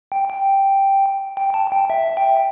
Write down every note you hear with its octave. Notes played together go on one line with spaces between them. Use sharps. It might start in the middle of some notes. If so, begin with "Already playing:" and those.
G5
G5
G5
A5
G5
E5
G5